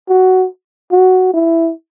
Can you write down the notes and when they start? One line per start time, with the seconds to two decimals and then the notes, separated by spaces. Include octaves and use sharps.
0.09 F#4
0.92 F#4
1.34 E4